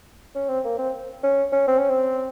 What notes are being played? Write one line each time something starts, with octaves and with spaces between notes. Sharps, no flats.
C#4
C4
A#3
C4
C#4
C#4
C4
C#4
C4